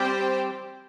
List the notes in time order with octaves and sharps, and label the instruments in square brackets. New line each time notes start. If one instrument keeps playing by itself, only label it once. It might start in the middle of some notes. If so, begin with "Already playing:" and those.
Already playing: [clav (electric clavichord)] G3 [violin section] C4 G4 C5 G5